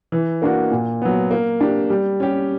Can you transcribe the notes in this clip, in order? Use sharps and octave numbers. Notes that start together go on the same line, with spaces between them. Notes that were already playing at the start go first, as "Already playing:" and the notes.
E3
A#3 D4 F#4
A#2
F#3 B3
A#3
D4 G4
G3
C#4 G4